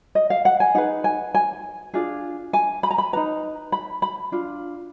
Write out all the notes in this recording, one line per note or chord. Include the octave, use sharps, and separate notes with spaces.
D#5
F5
F#5
G#5
D#4 G#4 B4 F#5
G#5
G#5
D4 F4 G#4
G#5
B5
A#5
B5
D#4 F#4 B4 A#5
B5
B5
D4 F4